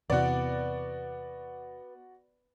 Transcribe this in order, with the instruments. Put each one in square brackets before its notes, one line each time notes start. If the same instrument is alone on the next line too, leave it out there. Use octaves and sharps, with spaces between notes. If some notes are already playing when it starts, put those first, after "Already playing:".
[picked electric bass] E2 C3 E3 [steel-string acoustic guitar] B3 [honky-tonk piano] F#4 D5